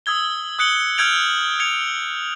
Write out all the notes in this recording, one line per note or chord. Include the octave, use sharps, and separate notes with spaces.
D#6 E6 G#6 G7
D#6 F#6 C#7 F#7 G7
E6 F6 G6 G#6 D7 F7
G#6 C#7 F7